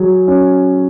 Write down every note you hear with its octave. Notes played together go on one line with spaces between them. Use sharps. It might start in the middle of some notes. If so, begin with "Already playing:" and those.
Already playing: F#3 G#4
C#4